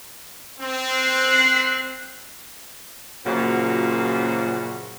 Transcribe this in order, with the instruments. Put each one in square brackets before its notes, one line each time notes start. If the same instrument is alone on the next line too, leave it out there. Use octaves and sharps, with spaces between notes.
[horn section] C4
[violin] F#6 C7
[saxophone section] F#2 A#2 C#3 F3 F#4